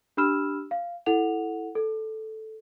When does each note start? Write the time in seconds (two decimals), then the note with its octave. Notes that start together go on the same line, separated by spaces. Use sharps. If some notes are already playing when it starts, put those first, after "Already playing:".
0.17 D4 G4 B5 E6 F6 E7
0.71 F5
1.06 E4 A4 F#5 F7
1.75 A4